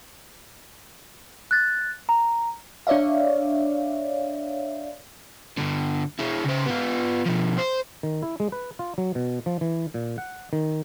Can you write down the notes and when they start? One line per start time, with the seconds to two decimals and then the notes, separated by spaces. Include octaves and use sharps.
1.51 F#6 A6
2.09 A#5
2.87 D4 C#5 D5 E5 F5
5.57 G2 D3
6.19 G#3 E4
6.44 C#3 C5
6.66 B3 F4
7.26 B2 F3
7.59 C5
8.03 D#3
8.23 E4
8.40 G#3
8.52 B4
8.79 F4
8.98 F#3
9.15 B2
9.46 F3
9.61 E3
9.94 A#2
10.18 F#5
10.53 D#3